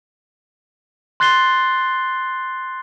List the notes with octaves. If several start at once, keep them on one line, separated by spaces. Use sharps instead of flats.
C6 F#6 A6 C7 G7